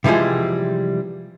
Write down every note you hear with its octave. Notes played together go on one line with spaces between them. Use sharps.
C3 E3 F3 G3 G#3